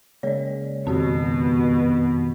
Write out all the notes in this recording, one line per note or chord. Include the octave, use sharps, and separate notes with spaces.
C#3 G#3 A#3 C#5 D5
F2 B2 D#3 C4 F#4 G4